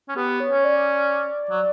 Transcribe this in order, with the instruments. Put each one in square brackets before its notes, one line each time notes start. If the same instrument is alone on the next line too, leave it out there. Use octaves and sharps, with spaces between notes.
[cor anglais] C#4
[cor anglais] B3 [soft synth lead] G4
[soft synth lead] C#5
[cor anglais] C#4
[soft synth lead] D5
[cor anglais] F#3